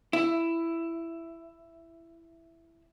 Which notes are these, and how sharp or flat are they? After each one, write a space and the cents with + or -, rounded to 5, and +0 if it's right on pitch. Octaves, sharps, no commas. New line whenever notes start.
E4 +10